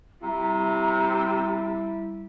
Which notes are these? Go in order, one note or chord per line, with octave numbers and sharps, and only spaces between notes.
C3 G3 E4 A#5